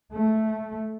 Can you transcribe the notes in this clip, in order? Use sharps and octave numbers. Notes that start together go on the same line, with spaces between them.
A3